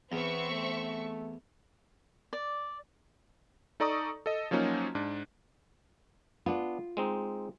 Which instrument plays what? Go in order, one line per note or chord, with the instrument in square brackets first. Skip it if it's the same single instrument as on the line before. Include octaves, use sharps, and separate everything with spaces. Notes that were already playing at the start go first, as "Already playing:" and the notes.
[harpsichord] E2 [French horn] B3 [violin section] C4 E5 C#6
[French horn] A3
[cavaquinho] D5
[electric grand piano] D#4 A4 D5 A#5 C#6 D#6
A4 D#5
F3 F#3 A#3 C#4 D#4 F#4
G#2 D4
[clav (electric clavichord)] B3 D4 [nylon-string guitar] F4
[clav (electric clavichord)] G#3 C4 D#4